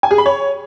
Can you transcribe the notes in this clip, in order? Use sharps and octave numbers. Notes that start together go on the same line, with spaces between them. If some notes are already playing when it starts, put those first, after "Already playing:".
G#5
G#4
B5
C#5